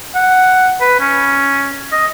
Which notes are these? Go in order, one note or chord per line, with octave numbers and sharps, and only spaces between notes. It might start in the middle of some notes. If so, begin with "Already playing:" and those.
F#5
B4
C#4
D#5